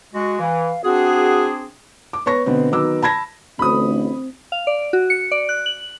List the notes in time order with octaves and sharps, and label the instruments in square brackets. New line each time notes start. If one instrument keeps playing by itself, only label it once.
[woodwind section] G#3 F#4
[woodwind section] E3 [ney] F5
[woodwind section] C4 D4 G#4 [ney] F#4
[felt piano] D6
B3 C#5 C#6 A#6
B2 D3 B3 C4
D#3 F#3 B3 D6 E6
A5 B5 G#6 A#6
[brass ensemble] A1 D2 [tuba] C4 [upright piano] B5 D#6
[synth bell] F5
D5
F#4
C#7
D5
F#6
F#7